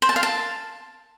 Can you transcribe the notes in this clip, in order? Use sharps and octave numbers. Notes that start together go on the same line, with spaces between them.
C5
A5
F5
A5